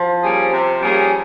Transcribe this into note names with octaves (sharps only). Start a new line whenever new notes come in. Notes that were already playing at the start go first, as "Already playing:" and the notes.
Already playing: F3
G3 A#3 C#4 G#4
C3
G3 A#3 C#4 G#4